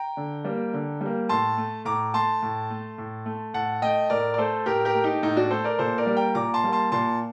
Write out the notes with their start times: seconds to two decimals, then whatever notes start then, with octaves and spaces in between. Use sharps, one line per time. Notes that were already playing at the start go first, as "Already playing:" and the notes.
Already playing: G5 A#5
0.17 D3
0.45 G3 A#3
0.73 D3
1.01 G3 A#3
1.29 A2 A5 C6
1.58 A3
1.85 A2 A#5 D6
2.14 A3 A5 C6
2.42 A2
2.70 A3
2.98 A2
3.25 A3
3.54 A2 F#5 A5
3.82 A3 D#5 G5
4.10 A2 A#4 D5
4.34 D5
4.38 A3 A4 C5
4.66 A2 G4 A#4
4.85 G4 A#4
4.95 A3
5.04 D#4 G4
5.22 A2 D#4
5.37 D4 F#4
5.51 A3 A4 C5
5.64 A#4 D5
5.79 A#2 A4 C5
5.98 A#4 D5
6.07 G3 A#3
6.17 G5 A#5
6.35 A#2 A#5 D6
6.54 A5 C6
6.64 G3 A#3
6.72 A5 C6
6.92 A#2 A5 C6